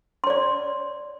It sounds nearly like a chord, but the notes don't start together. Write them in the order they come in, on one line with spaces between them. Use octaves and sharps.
C6 C#5 D5